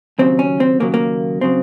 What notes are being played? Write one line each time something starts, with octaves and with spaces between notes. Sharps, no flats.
D#2 C#3 F#3 C4
C#4
C4
D#2 C#3 F#3 A#3
A#3
C#3 F#3 C4